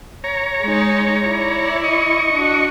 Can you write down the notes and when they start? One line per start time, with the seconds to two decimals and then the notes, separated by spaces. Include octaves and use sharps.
0.24 C#5 A#5
0.62 G#3 D#4
1.26 E4 D5
1.84 D#5 C#6
2.33 D4 F#4